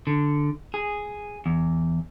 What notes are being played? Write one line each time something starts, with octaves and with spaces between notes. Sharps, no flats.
D3
G#4
E2